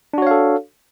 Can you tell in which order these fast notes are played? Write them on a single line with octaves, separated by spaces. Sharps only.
D4 F#4 C#5 F5 A4